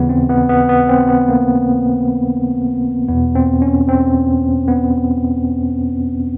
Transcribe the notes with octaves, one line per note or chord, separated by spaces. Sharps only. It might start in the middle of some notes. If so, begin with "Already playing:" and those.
Already playing: D#2 C#3 E3 B3
C4
B3
B3
B3
C4
B3
A#3
E2 B2 B3
C4
C#4
C4
B3